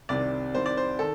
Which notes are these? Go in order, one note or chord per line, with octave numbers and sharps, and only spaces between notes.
C2 C3 D#3 D5
C2 C3 D#3 C5
D5
C5
D#3 A4